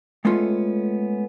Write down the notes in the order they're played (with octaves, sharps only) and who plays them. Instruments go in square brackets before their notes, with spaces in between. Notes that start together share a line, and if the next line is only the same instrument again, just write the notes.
[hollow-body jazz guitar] G#3 A3 B3 C#4 F4 A4